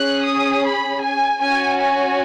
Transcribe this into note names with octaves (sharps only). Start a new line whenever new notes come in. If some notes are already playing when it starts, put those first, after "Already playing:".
Already playing: C#4 G#4 F#6
D#6
B5
G#5
C#4 F#4 G#5
G#5